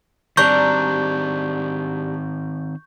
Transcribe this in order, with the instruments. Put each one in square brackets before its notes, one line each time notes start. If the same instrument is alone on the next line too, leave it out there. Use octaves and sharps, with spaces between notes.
[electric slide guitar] D#3 C4 [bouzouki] G3 D4 A#5 [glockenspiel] C#6 G6